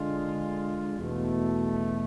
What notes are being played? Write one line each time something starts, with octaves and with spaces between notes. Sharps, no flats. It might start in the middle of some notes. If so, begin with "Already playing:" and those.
Already playing: D3 G#3 D4 F4
E2 B2 A3